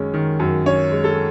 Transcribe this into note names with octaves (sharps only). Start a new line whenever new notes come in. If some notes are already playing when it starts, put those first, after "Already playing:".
Already playing: F#2 D#3 G#3 C#4
D#3
F#2
C#4 C#5
G#3
A4